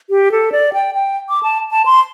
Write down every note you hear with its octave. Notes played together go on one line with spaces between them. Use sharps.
G4
A4
D5
G5
G5
D6
A5
A5
C6